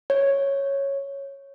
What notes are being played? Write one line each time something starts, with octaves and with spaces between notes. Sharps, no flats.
C#5